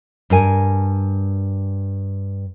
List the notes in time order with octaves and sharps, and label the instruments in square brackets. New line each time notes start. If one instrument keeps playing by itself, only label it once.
[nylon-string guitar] G2 A#4 G#5